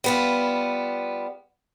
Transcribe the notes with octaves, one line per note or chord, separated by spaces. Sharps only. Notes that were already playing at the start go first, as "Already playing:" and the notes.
G3 B3 F4